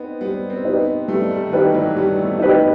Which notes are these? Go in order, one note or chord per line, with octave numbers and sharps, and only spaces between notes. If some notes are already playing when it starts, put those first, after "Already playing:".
Already playing: B3 C4 D#4
G3 B3
C4
D#4 G4 B4
B3
G3 A3
G3
D#3
E3 D#4 G4 B4
F#3
G3 B3
A3
B3 D#4 G4 B4